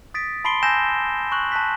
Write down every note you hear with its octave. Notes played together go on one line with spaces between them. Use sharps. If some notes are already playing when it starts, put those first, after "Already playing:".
D#6 A6 B6 D7
A5 B5 C6 C7 D7 G7
G#5 A5 E6 G6 A#6 E7
C#6 F#6 F#7
A5 B5 F#6 B6